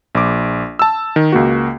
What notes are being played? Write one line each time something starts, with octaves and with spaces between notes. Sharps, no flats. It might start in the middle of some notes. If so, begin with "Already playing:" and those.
A#1 D6
A5 E6
D#3
C#2 A#3 F#4